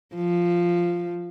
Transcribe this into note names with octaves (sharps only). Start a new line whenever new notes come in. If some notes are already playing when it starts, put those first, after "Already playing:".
F3